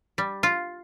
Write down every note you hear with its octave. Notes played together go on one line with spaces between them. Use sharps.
G3
F4